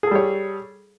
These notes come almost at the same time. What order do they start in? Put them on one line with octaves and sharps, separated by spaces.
G#4 A4 G3 C#5